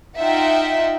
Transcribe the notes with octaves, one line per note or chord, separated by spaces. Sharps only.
D#4 F4 E5 F#5 G5